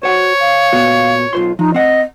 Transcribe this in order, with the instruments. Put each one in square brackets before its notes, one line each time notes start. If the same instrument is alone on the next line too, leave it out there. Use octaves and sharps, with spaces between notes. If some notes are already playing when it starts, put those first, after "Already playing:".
[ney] F#4 [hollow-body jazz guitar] C5 F#5 [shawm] C#5
[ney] F5
[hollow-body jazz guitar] A#2 B3 F#4
[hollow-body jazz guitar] B1 C5 C6 [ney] F4
[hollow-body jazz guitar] F3 [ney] D#4
[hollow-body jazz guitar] C4 F#5 [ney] D#5